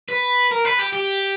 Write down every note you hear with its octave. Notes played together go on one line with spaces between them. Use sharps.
B4
A#4
B4
G4
G4